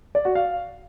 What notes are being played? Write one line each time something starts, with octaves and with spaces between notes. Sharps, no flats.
D5
F#4
F5